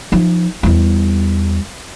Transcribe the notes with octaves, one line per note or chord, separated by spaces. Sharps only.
F3 D#4
E2 G3